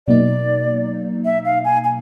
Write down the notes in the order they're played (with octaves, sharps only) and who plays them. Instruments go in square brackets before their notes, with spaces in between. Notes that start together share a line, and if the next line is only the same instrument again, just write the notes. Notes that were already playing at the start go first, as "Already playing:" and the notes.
[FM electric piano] B2 F#3 A#3 D#4 [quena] D5
[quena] E5
F5
G#5
G#5